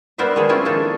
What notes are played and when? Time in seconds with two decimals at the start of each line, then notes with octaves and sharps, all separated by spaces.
0.18 G3 B3 A#4 C5 E5
0.36 D#3 F3 G#3 G#4
0.49 C4 C#4 E4 F4 E5
0.65 A#3 D4 D#4 A4